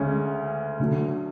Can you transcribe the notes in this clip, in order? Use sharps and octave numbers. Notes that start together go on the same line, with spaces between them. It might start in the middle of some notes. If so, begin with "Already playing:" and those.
Already playing: D2 C#3 G#3 C#4
D2 D3 F#3